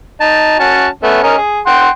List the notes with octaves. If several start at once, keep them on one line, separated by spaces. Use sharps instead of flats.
D#4 A5
C#4 F#4 A5
A3 B3 C#4
C#4 A#4 D#5
G#4
F#5 G5 C6